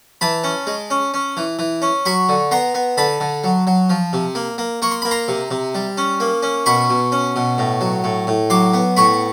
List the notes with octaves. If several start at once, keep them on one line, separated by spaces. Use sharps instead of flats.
E3 A5 B5
C#4
G#3
C#4
C#4
E3
E3
C#4
F#3 B5 C#6
D3
B3 A#5 C6
B3
D3 A5 B5
D3
F#3
F#3
F3
C3
A#3
A#3
A#3 C#6
C6
A#3 B5
A#5 C6
C3
C3
G3
C#4
A#3
C#4
B2 B5 C#6
B2
C#4
B2
A2
F#3
A2
A2
F#3 C6 D6
B3
A2 B5 C#6